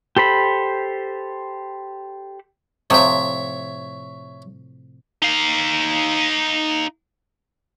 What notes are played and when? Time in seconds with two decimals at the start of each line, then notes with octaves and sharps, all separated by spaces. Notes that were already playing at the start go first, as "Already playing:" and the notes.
0.17 G4 A4 C5 B5
2.90 A2 C3 F3 C#5 E5
5.22 D#4 F5